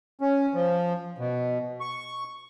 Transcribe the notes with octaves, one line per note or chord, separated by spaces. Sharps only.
C#4
F3
B2
C#6